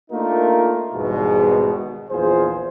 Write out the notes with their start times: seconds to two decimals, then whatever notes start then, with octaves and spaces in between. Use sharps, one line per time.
0.10 A3 A#3 D4 D#4 F4 A#4
0.94 G#1 E2 G#2 B2 G3 G#3
2.10 A#1 E2 F4 G#4 C5